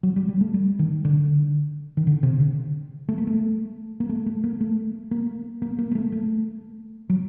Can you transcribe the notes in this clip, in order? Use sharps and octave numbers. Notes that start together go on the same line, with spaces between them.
F#3
G3
G3
A3
G3
D#3
D3
D#3
D3
C3
D3
A3
A#3
A3
A#3
A3
A3
A#3
A3
A#3
A#3
A#3
A#3
A3
A3
F#3